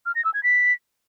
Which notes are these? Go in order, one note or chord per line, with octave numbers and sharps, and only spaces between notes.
F6
A#6
E6
G#6
B6